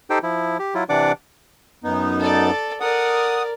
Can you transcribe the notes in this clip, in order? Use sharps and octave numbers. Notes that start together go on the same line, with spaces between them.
D#4 G4 A4 C5 G5
F3 E4
G4
F#3 E4 F4
C3 E3 D4 D5 F#5 D6
F#2 B3 D#4
A4 D5
A#4 D5 F#5 D#6